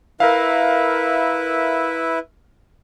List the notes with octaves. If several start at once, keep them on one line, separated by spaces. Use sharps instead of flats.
E4 A#4 B4 E5 F5